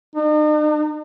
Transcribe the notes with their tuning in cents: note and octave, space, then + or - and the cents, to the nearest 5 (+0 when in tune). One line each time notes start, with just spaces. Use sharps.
D#4 -45